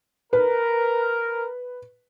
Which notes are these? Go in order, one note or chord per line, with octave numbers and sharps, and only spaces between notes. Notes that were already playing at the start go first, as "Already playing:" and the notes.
A#4 B4